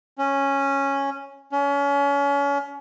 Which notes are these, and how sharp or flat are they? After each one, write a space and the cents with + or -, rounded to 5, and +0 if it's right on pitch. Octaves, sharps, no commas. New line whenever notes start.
C#4 -5
C#4 +30